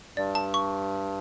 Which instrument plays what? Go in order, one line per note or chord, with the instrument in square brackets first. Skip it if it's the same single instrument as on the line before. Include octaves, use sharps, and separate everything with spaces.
[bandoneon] G2 [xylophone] D5
[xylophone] A5
C#6